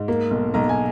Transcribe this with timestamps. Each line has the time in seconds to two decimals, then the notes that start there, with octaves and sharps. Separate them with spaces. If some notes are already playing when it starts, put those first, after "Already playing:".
Already playing: G#2
0.08 A#3
0.31 B1
0.54 B1 A#5
0.69 G#5